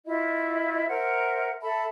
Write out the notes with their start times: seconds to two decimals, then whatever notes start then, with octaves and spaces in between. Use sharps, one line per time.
0.06 E4 F4 D#5 E5
0.88 A#4 C5 E5 F#5
1.62 A4 E5 A5 B5